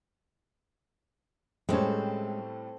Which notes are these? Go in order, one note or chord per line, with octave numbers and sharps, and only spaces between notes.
A2 G3 G#3 C4 C#4 A4